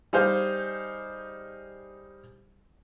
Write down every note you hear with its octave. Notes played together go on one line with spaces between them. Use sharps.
G3 D#4 G#4 C5 F5